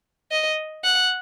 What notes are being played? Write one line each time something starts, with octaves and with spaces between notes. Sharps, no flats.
D#5
F#5